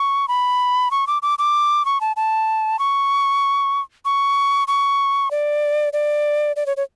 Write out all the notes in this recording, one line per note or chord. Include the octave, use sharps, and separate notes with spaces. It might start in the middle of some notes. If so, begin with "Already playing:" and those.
Already playing: C#6
B5
C#6
D6
D6
D6
C#6
A5
A5
C#6
C#6
C#6
D5
D5
D5
C#5
C#5